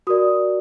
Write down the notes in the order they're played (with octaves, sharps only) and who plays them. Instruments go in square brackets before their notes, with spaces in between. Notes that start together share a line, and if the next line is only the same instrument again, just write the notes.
[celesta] F#4 A#4 D5 D#6